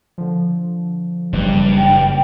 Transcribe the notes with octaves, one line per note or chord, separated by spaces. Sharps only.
D3 F3
F#1 G2 E3 G3
G5